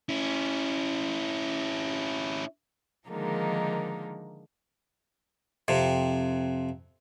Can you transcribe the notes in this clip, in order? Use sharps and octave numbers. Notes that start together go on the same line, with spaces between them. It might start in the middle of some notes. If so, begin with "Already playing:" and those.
C#4 E4
D3 D#3 F3 G#3 A#3 D#4
F2 C3